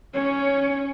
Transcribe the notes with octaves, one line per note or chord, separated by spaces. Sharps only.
C#4 C#5